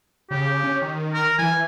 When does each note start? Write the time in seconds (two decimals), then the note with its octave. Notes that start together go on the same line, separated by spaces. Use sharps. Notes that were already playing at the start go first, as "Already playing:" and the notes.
0.31 C#3 G4
0.63 C#4
0.82 D#3
1.14 A#4
1.38 E3 G#5